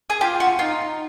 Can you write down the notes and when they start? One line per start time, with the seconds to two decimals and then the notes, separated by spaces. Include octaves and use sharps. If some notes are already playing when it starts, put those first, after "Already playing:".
0.10 G#4
0.21 F4 G4
0.40 F#4
0.59 D#4 F4